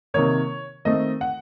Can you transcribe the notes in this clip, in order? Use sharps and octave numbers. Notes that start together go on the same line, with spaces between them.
C3 D#3 A#3 C#5
D#3 A3 C4 D#5
F#5